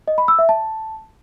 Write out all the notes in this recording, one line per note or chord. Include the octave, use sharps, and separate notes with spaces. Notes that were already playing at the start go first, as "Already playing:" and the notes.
D#5
B5
E6
E5
A5